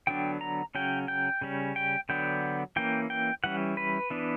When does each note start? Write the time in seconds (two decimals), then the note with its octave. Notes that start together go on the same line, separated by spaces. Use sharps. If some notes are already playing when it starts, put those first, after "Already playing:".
0.07 D3 F#3 B3 D4 G5
0.41 A#5
0.75 C#3 F#3 C#4 G5
1.08 G5
1.41 C#3 G3 C#4
1.76 G5
2.09 D3 F#3 B3 D4 G5
2.76 E3 A#3 C#4 G5
3.10 G5
3.44 E3 G3 C#4 F#5
3.77 B4
4.10 E3 B3 D4